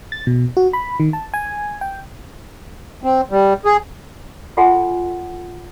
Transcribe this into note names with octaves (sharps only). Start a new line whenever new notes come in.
A6
B2
F#4
B5
D#3
A5
G#5
G5
C4
G3
G#4
F4 A4 D#5 F#5 G#5 C6